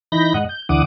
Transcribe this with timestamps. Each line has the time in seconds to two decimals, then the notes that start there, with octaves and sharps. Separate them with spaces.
0.12 E3 D#4 B5 G6 A#6
0.34 G#2 D#5 F#5
0.49 G6
0.69 D2 D3 E3 F#5 D6 D#6